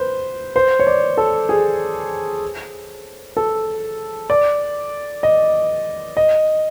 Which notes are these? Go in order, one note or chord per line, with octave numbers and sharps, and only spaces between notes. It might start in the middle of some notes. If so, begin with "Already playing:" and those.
Already playing: B4 C5
C5
C#5
D5
A4
G#4
A4
D5
D#5
D#5